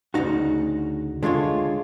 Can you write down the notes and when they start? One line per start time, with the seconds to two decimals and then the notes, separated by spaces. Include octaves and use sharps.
0.14 D2 C#3 D#4 F#4
1.23 D3 G#3 F4 C#5